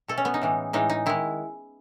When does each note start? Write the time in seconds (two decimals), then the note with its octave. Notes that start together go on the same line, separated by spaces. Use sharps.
0.08 B2 A3 A4
0.18 C#4
0.25 B3
0.34 D#4
0.42 A2 E3 G#3
0.73 A2 E3 G#3 D#4
0.90 D#4
1.06 D#3 G#3 E4